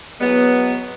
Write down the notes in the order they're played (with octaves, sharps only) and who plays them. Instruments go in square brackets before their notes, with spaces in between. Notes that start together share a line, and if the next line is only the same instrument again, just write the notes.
[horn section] E3 F#3 G#3 B3